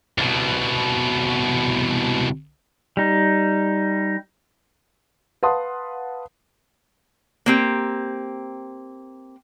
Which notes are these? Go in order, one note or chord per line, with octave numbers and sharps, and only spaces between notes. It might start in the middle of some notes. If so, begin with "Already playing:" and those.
C2 B2
G3 D#4
B4 F5 F#5 A5 C6 D#6
A#3 C4 G4